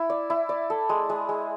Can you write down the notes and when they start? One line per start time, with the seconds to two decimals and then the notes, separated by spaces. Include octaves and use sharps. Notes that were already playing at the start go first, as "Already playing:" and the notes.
Already playing: E4
0.10 D5
0.30 E4
0.49 D5
0.70 A4
0.89 G#3
1.09 G#3
1.29 G#3